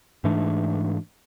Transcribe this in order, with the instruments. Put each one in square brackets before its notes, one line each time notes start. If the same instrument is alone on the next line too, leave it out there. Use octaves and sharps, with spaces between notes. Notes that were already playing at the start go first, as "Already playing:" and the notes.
[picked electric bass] G#2 E3 A3 D4